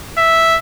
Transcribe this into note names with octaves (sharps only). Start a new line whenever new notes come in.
E5